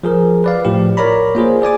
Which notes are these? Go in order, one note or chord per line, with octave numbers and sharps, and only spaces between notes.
F3 G#4 A#4
B4 D5 F5
A2 F3 G4
A#4 C#5 D5 A#5 B5
A#3 F4 G#4 C5
G#4 D5 G#5 D6